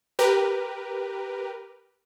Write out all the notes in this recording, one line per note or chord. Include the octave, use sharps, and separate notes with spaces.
G4 A#4 B4